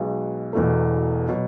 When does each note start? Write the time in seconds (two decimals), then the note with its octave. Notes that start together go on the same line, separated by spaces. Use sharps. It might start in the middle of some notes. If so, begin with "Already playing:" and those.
Already playing: B1 B2 G#3
0.53 E1 E2 B2 A3
1.29 B2 F#3